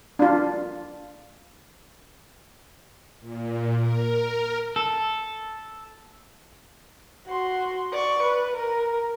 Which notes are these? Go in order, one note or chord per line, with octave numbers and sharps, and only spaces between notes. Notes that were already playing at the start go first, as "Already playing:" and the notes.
D4 F4
A#2
A#4
A4
F#4 C6
D5 C#6
B4
A#4